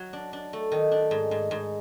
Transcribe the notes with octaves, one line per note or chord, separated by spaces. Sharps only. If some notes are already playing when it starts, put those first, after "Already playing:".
Already playing: F#3
D4
D4
A3
D#3
D4
G#2
G#2
G#2